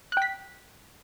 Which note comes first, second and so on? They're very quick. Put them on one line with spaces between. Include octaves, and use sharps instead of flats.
F#6 G5 B6